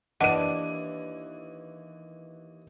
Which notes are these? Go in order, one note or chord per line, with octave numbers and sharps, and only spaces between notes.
D#2 E3 D4 D#5 F#5 D#7